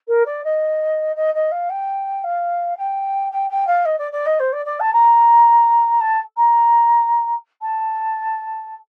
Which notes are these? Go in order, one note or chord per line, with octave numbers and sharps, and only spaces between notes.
A#4
D5
D#5
D#5
D#5
F5
G5
F5
G5
G5
G5
F5
D#5
D5
D5
D#5
C5
D5
D5
A5
A#5
A5
A#5
A5